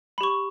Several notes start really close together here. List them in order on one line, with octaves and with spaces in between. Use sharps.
B5 G4 C#6